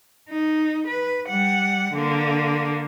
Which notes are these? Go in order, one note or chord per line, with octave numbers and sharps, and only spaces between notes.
D#4
B4
G3 F#5
D3 A#3